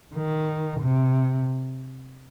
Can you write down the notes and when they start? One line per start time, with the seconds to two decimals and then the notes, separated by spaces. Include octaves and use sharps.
0.15 D#3
0.79 C3